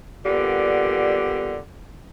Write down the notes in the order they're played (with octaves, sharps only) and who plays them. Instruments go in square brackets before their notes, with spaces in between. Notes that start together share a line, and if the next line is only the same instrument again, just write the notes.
[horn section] A#2 D3 G3 B3